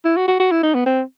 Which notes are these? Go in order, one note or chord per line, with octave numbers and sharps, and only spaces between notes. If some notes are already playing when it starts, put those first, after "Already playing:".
E4
F#4
F#4
F#4
E4
D#4
B3
C4